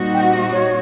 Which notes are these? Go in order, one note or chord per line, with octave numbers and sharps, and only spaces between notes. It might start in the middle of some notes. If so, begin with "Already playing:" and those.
Already playing: A#2 G3 C4 D#4 F#4
G5
F#5
C#5